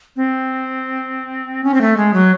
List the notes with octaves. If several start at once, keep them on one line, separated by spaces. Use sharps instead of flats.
C4
C#4
C4
A3
G#3
F#3